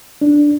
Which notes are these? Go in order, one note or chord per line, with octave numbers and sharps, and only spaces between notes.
D4